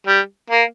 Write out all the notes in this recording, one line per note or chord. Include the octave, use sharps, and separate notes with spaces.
G3
A#3